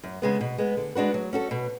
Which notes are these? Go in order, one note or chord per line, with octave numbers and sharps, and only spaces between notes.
F#2
C#3 G#3 B3
B2
G#3 B3
D3
G#3 D4 F#4 B4
F#3
C#4 F#4 A4
B2